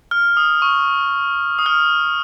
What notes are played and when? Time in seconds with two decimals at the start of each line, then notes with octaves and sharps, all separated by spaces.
0.11 F6
0.37 D#6
0.62 C#6
1.59 D#6
1.66 F6